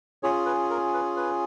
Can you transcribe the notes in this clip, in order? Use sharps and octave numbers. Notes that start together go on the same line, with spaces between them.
C#4 F4 G#4 C#5
B4
A#4
B4
B4